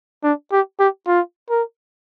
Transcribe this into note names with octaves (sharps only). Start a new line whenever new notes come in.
D4
G4
G4
F4
A#4